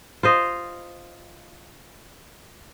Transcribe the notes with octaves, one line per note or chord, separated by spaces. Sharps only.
F4 C5 D#5